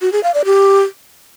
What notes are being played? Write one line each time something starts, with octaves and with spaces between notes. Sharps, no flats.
F#4
G#4
F5
D5
G4